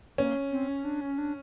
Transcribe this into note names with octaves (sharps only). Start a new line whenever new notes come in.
A#3 C#4
C4
C#4
D4
C#4
D4